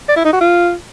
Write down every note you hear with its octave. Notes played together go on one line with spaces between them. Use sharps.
D5
E4
D#4
F#4
F4